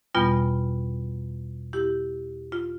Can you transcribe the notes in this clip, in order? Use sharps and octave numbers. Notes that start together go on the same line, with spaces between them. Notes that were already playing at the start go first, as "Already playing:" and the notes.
E2 B2 G3 B3 F4
E4 G4
F4